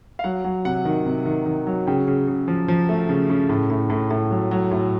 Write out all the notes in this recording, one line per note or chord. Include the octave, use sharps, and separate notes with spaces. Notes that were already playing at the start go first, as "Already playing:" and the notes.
F5
F#3 F#5
F#3
C3 F#5
D#3
C3
D#3
D#3
F#3
C#3 G5
C#3
C#3
F3
F3
A3
C#3
C#3
A2
A2
A2
A2
F#3
F#3
A2